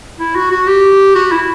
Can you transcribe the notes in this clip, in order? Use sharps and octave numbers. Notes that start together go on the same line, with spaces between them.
E4
F#4
F#4
G4
F#4
E4